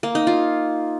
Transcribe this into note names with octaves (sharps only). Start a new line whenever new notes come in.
A#3
D#4
F4